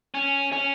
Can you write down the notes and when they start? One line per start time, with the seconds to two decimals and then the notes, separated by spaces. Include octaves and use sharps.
0.14 C#4
0.52 C#4